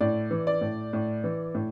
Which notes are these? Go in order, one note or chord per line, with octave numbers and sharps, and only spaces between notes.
A2 D5
E3
D5
A2
A2
E3
A2